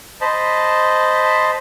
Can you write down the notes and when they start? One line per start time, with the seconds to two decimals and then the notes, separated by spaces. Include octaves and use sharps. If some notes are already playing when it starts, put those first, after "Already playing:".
0.21 C5 D#5 A5 B5